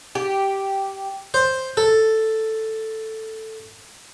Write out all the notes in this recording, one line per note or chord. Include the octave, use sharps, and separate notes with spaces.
G4
C5
A4